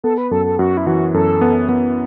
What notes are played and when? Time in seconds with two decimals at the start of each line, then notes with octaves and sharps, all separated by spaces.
0.04 B3 A4
0.18 B4
0.31 F#2 A4
0.45 A4
0.59 F#2 F#4
0.77 E4
0.87 E3 F#4
1.14 F#2 A4
1.41 B3
1.69 B3